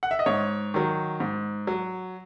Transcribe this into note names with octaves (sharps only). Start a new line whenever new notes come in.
F#5
E5
D#5
G#2 C#5
D#3 F#3
G#2
F#3